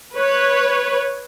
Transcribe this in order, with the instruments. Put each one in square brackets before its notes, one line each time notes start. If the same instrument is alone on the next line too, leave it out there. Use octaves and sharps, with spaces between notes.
[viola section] B4 C#5